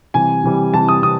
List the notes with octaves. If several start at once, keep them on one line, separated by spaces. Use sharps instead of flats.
C3 E3 G3 G#5
C3 E3 G3
C3 E3 G3 A5
D#6
C3 D#6